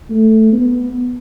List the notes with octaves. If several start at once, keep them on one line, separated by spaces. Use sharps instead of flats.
A3
B3